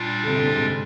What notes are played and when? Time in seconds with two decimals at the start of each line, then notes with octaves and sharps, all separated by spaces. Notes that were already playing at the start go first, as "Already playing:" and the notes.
Already playing: A#2 G3 D4 F4
0.23 D3
0.28 C3
0.37 D3
0.47 C3
0.56 G#2